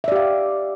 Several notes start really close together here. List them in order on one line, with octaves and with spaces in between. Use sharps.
E5 D5 G4 F5